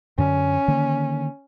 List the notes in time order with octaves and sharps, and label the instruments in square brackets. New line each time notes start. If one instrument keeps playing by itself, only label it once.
[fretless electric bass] F#2 D3 [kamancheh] C#4
[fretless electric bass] D3 D#3 A#3